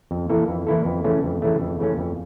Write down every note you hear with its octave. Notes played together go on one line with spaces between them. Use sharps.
F2
E3 A#3 E4 A4
F2
E3 A#3 E4 A4
F2
C#3 E3 A3 C#4
F2
C#3 E3 A3 C#4
F2
C#3 E3 A3 C#4
F2